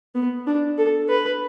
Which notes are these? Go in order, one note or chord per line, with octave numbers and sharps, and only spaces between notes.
B3
D4
A4
B4